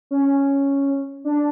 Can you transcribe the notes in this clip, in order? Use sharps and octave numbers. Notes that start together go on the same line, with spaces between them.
C#4
D4